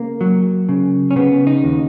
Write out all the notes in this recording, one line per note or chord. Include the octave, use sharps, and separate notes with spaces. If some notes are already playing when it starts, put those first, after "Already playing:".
Already playing: C#3 A#3
F#3
C#3
C#4
C#3 B3
D#4
D#2